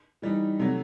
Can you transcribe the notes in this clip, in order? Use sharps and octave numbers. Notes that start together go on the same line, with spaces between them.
E3 G3 D#4
C3 F#3 A3